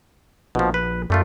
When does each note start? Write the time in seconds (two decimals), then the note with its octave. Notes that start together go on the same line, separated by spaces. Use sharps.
0.55 A#1 B2 F3
0.74 B4
1.10 F#2 G3 A3 F4